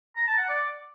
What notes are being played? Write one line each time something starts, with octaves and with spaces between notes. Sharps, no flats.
A#5
A5
F#5
D5